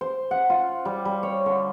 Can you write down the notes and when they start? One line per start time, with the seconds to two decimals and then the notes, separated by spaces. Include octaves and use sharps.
0.01 C5
0.31 F#5
0.50 F4
0.85 G3
1.05 G3
1.23 C#5
1.46 D3